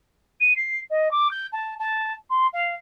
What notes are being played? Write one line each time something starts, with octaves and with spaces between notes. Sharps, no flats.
D#7
C7
D#5
D6
G6
A5
A5
C6
F5